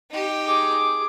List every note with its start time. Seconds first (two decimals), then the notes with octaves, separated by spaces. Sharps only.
0.11 D#4 G4
0.46 G#4 D6